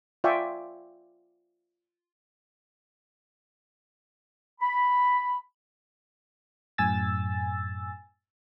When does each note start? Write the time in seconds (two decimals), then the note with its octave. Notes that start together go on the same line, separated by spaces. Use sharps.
0.24 F4 D5 E5 G5 G#5 C#6
4.60 B5
6.78 F#2 A2 G#5 E6 A6